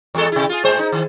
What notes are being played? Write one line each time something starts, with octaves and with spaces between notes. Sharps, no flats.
E2 G#3 A4
C3 E4
F4 G#4
A2 G#3 C5
D#4
D#3